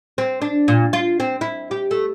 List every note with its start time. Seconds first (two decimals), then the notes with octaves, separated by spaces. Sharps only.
0.18 C4
0.42 D4
0.68 A#2
0.93 F4
1.20 C4
1.41 E4
1.71 G4
1.91 A3